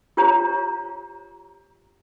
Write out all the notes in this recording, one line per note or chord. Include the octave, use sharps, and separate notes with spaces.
F4 G4 C5 C#5 A#5